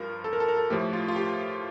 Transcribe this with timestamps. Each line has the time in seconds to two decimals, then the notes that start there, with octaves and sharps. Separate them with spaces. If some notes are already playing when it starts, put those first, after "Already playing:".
Already playing: G2 F3 F4 A#4
0.24 A4
0.33 A#4
0.40 A4
0.48 A#4
0.57 A4
0.70 A2 F3 A3 G4
0.93 F4
1.08 F4
1.16 G4